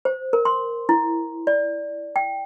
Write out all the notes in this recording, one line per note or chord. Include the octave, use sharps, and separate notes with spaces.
C5
A#4
C6
E4
D5
G5